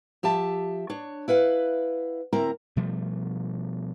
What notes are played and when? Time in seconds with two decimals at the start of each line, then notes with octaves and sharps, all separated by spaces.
0.23 F3 G4 E5 A5
0.90 D4 C#5
1.28 E4 B4 F5 F#5
2.33 D2 C4 E4 A#4 A#5
2.76 B2 F3 G3 A3